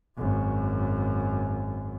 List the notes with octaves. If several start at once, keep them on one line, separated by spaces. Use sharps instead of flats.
G#1 F#2